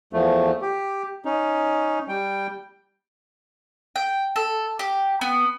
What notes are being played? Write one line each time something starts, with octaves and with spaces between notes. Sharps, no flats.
E2 F3 A3
G4
C#4 D#4
G3 G5
G5
A4
G4
B3